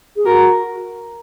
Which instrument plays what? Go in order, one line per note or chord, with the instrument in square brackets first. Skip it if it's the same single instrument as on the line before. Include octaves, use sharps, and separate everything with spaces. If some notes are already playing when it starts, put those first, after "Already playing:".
[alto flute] G#4
[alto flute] F#4 [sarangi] A#4